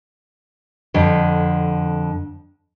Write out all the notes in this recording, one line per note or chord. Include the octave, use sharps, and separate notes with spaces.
F2 D3